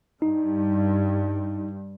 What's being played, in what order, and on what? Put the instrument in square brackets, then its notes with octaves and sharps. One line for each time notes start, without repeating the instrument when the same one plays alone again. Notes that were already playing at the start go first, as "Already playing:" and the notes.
[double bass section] G2 [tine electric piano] D#4